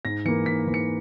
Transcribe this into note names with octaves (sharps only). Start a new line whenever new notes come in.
G#2 A#6
E3 A#3 C#7
G#2 B6
E3 A#3
C#7